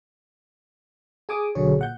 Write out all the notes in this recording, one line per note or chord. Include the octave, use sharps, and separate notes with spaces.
G#4 G#5 D6 D#6
B1 D3 F#3 G#4 C#5
A#2 F#5 G6